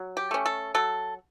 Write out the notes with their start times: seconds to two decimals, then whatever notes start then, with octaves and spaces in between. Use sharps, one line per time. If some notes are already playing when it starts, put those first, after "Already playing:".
Already playing: F#3
0.17 G4
0.31 A3 C#4
0.46 A4
0.75 F#3 A4